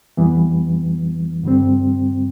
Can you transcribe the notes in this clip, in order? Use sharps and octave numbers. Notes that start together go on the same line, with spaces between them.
F2 E3 G3 B3
G2 D3 G3 C4